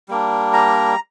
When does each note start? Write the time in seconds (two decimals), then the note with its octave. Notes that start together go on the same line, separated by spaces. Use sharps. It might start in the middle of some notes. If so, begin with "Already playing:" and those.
0.09 G3 A#3 D4
0.53 A#5